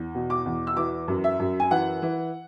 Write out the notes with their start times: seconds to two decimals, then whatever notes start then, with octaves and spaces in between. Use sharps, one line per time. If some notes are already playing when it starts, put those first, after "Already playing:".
Already playing: E2
0.15 B2
0.30 D6
0.46 E2
0.67 E6
0.77 E3 D6
1.08 F#2
1.24 E5
1.40 F#2
1.60 G#5
1.71 E3 F#5
2.02 E3